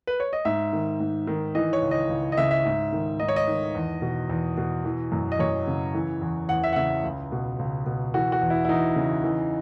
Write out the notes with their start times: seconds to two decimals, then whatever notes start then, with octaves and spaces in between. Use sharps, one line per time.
0.07 B4
0.20 C#5
0.33 D#5
0.45 G#2 E5
0.73 D#3
1.00 G#2
1.27 D#3
1.55 E3 D#5
1.73 C#5
1.82 C#2
1.91 D#5
2.09 C#2
2.32 D#5
2.37 C#3 E5
2.51 E5
2.65 G#2
2.93 D#3
3.20 G#2 D#5
3.28 C#5
3.36 D#5
3.48 D#3
3.75 E2
4.02 B2
4.29 E2
4.57 B2
4.85 E3
5.12 F#2
5.32 D#5
5.39 F#2 C#5
5.67 C#3
5.94 E3
6.21 E2
6.49 E2 F#5
6.64 E5
6.73 F#5
6.76 C#3 E5
7.04 C#2
7.32 B2
7.59 C#2
7.86 B2
8.14 E3 F#4
8.32 F#4
8.42 E2
8.50 E4
8.65 E4
8.69 E2 D#4
8.96 C#3
9.24 E3